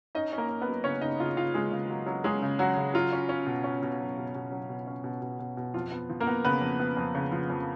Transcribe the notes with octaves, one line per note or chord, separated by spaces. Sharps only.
C#4 D#4 D#5
C#4
A#3 A#4
C#4
B3 B4
F#3
C#3 C#4 C#5
C#3 D#4 D#5
C#3 F4 F5
C#3 F4 F5
C#3 G#3 G#4
C#3
F#3
F#3
G#3 C#4 G#4
C#3
F#3 F#4
C#3
F#3 F4
C#4
C#4
B2
C#4
B2
F#3
B2
B2
F#3
B2
C#4
B2
B2
B2
B2
F2 F4
B3
F3
A#3 A#4
B3
C#3 B3 B4
F2
B3
F2
C#3
F3
F2